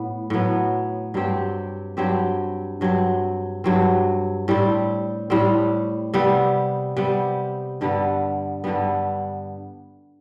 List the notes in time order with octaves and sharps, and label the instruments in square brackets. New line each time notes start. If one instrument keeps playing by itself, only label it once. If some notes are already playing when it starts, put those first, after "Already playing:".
Already playing: [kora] A2 B3
A2 F#3 B3
G2 F#3 C4 G4
G2 F#3 C4 G4
G2 F#3 C4
G2 F#3 C4
A2 G3 C4
A2 G3 C4
C3 G3 B3
C3 G3 B3
G2 D3 G3 B3
G2 D3 G3 B3